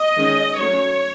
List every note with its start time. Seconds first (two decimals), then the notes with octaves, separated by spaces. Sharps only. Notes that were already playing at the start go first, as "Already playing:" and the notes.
Already playing: D#5
0.17 D#3 G#3 C#4
0.59 F#3 A3 C#4 C#5